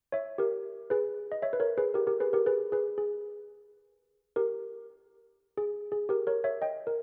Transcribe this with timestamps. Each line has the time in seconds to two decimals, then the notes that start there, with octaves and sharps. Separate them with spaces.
0.12 C#5 E5
0.38 G4 A#4
0.90 G#4 B4
1.32 D#5
1.42 C#5 E5
1.53 B4
1.60 A#4 C#5
1.78 G#4 B4
1.94 G4 A#4
2.07 G4 A#4
2.20 G#4 B4
2.33 G4 A#4
2.46 G#4 B4
2.72 G#4 B4
2.98 G#4
4.36 G4 A#4
5.57 G#4
5.92 G#4
6.09 G4 A#4
6.27 A#4 C#5
6.44 C#5 E5
6.62 D#5 G5
6.87 A#4